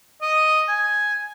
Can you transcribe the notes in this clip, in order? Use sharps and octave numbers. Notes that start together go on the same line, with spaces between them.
D#5
G#5